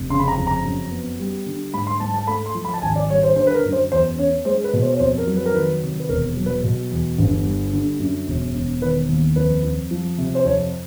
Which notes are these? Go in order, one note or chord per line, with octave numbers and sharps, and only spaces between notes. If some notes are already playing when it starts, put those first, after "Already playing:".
Already playing: F1
C#3 C6
B5
A#5
F2
A#5
F#2
B3
G3
D3
G#2 B5
C6
G#2 A5
A5
A3 B5
C6
F3
B5
A5
G#1 G#5
D5
G3 C#5
C5
D3 C5
B4
A#4
F#2
C5
E2 C5
C#4 C#5
G#3 C5
B4
B2
C5
C#5
F2 C5
A#4
F#3
B4
A#4
D#3 B4
C3
B4
E1 A#4
F#3
B4
B2
E2
G1
G3
D3
F#2
E1
E1
D#3 B4
D#2
F2 B4
F2
F3
C3
C5
F2 C#5